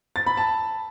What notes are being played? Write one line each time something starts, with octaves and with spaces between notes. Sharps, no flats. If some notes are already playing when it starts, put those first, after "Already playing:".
A6
B5
A5